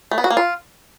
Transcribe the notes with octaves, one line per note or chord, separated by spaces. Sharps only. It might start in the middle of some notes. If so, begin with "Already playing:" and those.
A3
B3
F#4
A#3
F4